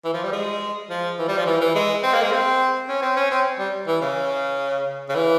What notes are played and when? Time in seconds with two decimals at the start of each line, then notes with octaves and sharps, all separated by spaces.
0.04 E3
0.14 F3
0.24 G3
0.33 G#3
0.90 F3
1.19 E3
1.28 G3
1.37 F3
1.46 E3
1.61 E3
1.75 G#3
2.03 C4
2.13 A#3
2.22 G#3
2.32 C4
2.88 C#4
3.02 C4
3.16 C#4
3.31 C4
3.59 G3
3.87 E3
4.01 C#3
5.09 C#3
5.15 E3